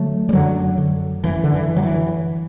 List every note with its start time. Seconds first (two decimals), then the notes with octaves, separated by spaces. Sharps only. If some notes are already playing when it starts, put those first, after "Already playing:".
Already playing: D3 F#3 A3
0.29 G3
0.33 F#2 D3 F#3
0.78 D3
1.24 F#2 E3
1.44 D3
1.54 E3
1.69 D3
1.77 F#3
1.83 E3